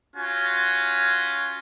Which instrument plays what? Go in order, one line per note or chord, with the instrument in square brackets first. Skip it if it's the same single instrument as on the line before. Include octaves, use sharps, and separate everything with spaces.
[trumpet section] C#4 F4 F#4 G#5